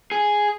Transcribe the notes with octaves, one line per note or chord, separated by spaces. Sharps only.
G#4